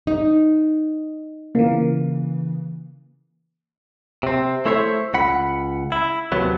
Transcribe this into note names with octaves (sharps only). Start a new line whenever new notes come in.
D#4
C#3 E3 A#3
C3 C4
A3 E4 C5 C#5 E5
C#2 F#5 B5
E4
D#2 C3 F#3 B3